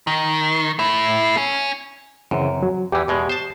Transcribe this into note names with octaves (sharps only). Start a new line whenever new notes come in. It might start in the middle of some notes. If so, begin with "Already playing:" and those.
D#3
A3 E4
C#4
F#2 C#3 E3 C4
F#3
E2 E3 G4
E2 B2 G#3
C5 A5